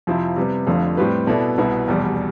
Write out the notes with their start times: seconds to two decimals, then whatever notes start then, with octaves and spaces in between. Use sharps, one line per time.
0.07 F2 C3 F3 C4 E4
0.36 C3 G3 B3
0.67 F1 F2 D3 F3 A3
0.97 A2 G3 C4 G4 B4
1.27 B2 B3 E4 A4 D5
1.58 C2 B2 B3 E4
1.88 F1 E2 B2 G3